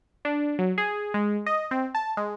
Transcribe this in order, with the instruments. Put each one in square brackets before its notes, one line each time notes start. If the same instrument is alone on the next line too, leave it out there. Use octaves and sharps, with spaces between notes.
[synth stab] D4
F#3
G#4
G#3
D#5
C4
A5
G#3